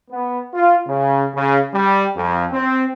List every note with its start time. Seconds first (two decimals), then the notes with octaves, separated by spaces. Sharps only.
0.10 B3
0.54 F4
0.87 C#3
1.35 C#3
1.74 G3
2.16 F2
2.52 C4